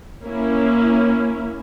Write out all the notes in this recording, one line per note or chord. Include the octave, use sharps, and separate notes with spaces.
A#3 C#4 E4